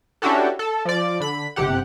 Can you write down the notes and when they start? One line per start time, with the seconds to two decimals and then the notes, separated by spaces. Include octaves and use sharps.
0.22 C#4 D4 E4 F#4 G4 A4
0.59 A4
0.85 F3 D5
1.20 D3 B5
1.56 G1 C3 G4 F#5